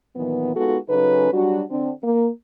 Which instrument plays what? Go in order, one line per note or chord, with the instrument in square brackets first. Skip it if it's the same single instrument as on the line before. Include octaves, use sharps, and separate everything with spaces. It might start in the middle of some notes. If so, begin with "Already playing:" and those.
[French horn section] A#2 D#3 E3 F#3 B3
G#3 B3 D#4 F4 F#4 A4
C#3 F#3 C#4 D#4 A4 B4
F#3 G3 D4 F#4
D3 C4 D4
A#3